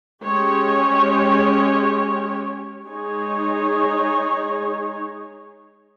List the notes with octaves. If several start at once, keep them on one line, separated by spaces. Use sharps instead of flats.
G#3 C#4 G4 C#5
G#3 D#4 G#4 C#5